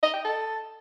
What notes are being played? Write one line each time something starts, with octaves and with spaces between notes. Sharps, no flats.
D#5
G5
A4